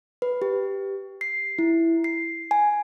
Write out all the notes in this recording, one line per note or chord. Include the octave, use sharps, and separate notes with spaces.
B4
G4
C7
E4
C7
G#5